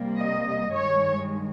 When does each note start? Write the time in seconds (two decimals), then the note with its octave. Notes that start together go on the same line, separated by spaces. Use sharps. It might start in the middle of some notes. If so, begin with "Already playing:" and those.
Already playing: C3 G3 A#3
0.20 D#5
0.72 G2 D#3 G#3 C#5